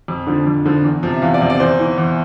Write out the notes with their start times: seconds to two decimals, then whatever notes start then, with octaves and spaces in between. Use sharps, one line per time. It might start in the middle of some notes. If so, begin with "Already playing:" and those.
0.08 F2
0.27 D3 F3
0.46 F2
0.66 D3 F3
0.84 E2
1.03 C3 F3
1.13 E5
1.22 E2 F5
1.34 D5
1.41 C3 F3
1.50 D5
1.60 E2 C5
1.79 E3
1.98 E2